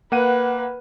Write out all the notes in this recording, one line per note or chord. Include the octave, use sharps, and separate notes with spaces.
A#3 B4 F#5 D#7